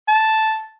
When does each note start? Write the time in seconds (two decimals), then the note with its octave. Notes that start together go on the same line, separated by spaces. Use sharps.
0.08 A5